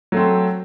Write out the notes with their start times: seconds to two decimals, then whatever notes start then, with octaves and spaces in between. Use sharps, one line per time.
0.12 F#3 A3 C4